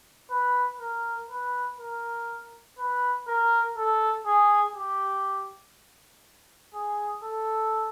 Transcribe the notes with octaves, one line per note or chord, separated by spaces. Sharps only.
B4
A#4
B4
A#4
B4
A#4
A4
G#4
G4
G#4
A4